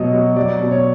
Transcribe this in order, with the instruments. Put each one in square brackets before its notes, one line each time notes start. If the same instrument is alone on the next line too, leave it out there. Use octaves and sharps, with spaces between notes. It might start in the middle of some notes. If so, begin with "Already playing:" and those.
Already playing: [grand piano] B2 F#3 D#5
F#3
F#3 D5
B2
C#5